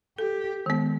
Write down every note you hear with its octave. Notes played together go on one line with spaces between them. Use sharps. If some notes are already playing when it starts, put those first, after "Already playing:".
G4 A4
D#3 G#3 B3